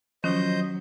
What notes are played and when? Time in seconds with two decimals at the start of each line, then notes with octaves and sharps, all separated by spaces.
0.24 D#3 F3 F#3 C#4 C5 D#5 G6